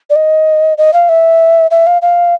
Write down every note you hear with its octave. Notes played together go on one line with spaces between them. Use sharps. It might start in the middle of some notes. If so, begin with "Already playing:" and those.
D5
D#5
D#5
F5
E5
E5
F5
F5